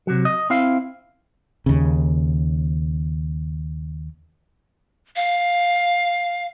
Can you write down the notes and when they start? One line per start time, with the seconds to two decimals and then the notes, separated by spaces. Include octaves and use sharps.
0.07 C3 F#3
0.25 D#5
0.50 C4 E4 F5
1.66 D#2 C#3
5.16 F5